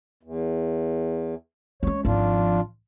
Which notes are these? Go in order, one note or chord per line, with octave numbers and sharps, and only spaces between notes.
E2
G#3 C#4 C#5
G#1 F3 D4 F4